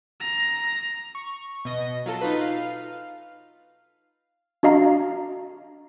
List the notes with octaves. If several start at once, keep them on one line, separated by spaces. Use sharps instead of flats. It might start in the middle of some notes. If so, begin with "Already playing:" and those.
A#5
C#6
B2 D#5 A#6
F#3 F4 A4
D#4 F4 B4
F5
D4 F#4 D#5 F5 A#5